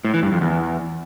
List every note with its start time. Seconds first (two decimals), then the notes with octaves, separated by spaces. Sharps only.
0.05 A2
0.14 E3
0.23 G2
0.32 F2
0.41 E2